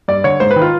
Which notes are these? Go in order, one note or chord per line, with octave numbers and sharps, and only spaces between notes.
G2 D5
D3 C#5
G#2 C5
B4
D#3
F4